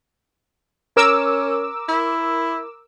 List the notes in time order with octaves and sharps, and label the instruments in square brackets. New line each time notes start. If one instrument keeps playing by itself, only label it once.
[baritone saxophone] C#4 [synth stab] A#4 D6 E6
[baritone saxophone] E4